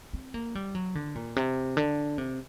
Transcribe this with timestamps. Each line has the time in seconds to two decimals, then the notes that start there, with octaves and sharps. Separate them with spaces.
0.13 C4
0.34 A#3
0.55 G3
0.75 F#3
0.95 D3
1.15 A#2
1.36 C3
1.77 D3
2.18 C3